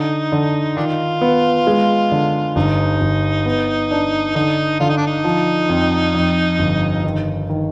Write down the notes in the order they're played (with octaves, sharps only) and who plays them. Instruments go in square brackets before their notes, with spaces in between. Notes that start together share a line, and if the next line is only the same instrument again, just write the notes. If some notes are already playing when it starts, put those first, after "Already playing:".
Already playing: [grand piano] D3 [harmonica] D#4
[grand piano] D3
[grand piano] D#3 [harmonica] D4 F4
[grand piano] B3
G#3
D3
[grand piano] G1 [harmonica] D#4
[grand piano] G1
B3
D4
[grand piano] D3 [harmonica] D#4
[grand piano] D3 [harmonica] F4
[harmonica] D#4
D4
D#4
[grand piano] F3
F2
F2
G1
D#3
D#3